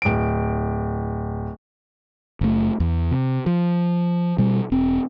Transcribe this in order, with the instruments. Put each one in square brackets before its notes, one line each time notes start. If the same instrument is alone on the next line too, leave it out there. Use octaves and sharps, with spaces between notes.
[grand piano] D1 D7
[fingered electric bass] F#1 A3
E2
C3
F3
B2 G3
E1 C4